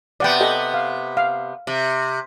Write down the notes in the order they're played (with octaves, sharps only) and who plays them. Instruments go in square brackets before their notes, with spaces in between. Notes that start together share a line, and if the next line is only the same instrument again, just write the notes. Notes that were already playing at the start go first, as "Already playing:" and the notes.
[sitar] C3 B3 [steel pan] D5 F#5 G5
[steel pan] G4 A4 D#5
F5
F5
[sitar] C3